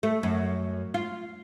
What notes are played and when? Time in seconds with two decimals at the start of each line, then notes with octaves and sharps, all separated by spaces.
0.03 A3
0.23 F#2
0.94 F4